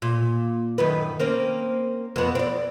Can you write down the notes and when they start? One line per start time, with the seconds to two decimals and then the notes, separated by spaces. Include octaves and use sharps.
0.02 A#2
0.78 F#2 D#3 B4
1.20 A#3 C4 C#4
2.16 F2 B3
2.35 C4 D5